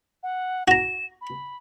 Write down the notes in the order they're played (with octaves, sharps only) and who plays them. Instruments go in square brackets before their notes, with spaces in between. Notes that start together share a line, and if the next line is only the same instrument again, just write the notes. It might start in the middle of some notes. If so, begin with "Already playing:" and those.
[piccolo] F#5
[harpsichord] F#4 A#5 [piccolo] E7
[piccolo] B5